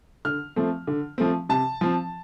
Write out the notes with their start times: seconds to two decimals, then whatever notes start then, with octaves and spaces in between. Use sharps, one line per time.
0.25 D3 F6
0.56 F3 A3 C4
0.87 D3
1.18 F3 A3 C4
1.49 C3 A5
1.81 F3 C4